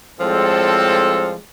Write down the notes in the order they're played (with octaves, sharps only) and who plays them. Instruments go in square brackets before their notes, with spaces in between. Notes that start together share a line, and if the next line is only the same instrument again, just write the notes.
[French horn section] A2 G3 G#3 [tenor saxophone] F3 [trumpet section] C4 A4